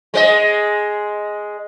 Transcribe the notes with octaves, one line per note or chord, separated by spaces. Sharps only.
G#3 B4 D#5